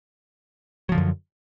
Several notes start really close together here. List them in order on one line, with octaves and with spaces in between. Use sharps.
F#3 F3 D3 F#2